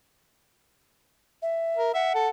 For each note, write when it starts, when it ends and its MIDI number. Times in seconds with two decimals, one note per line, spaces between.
1.42 1.93 76
1.77 1.92 70
1.94 2.15 76
1.94 2.29 78
2.15 2.29 69